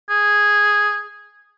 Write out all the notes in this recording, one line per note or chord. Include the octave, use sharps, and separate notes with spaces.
G#4